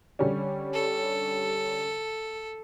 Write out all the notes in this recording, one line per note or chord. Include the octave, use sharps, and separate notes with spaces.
D3 G3 C#4
A4